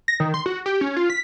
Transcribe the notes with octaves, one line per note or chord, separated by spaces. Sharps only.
A#6
D#3
C6
F#4
G4
C#4
F4
B6